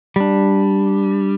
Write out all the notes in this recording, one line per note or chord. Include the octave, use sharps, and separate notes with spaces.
G3 D4